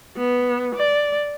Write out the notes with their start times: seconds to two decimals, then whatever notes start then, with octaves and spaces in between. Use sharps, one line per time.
0.17 B3
0.76 D5